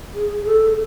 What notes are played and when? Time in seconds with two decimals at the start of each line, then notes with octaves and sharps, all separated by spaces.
0.14 G#4
0.46 A4